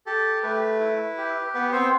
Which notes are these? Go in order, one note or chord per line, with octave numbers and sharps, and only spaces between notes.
G4 A4
A3 B4
E4
G4
B3 B4
C4 C5